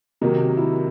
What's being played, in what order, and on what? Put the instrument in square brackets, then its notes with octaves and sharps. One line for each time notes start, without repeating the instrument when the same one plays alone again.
[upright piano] C3 D#3 F#3 A#3 D#4
E4